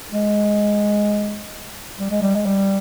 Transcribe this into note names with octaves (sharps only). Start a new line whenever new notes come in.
G#3
G3
G#3
G3
G#3
G3